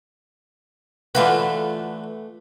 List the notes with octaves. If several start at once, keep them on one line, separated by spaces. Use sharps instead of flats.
D3 E3 A3 F4 F#4 B4